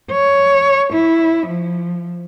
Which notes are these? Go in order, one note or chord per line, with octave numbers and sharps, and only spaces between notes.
C#5
E4
F3